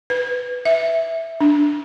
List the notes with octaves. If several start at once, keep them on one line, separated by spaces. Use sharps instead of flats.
B4
E5
D4